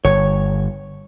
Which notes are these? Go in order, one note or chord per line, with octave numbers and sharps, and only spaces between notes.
G1 C#5